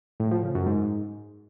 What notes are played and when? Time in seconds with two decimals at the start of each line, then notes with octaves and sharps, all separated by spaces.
0.20 A2
0.31 F3
0.43 C#3
0.55 F#2
0.66 G#2